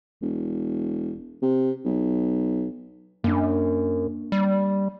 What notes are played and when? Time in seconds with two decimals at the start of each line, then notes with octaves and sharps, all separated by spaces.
0.22 E1
1.42 C3
1.85 B1
3.24 F#2 A#3 D4
4.32 G3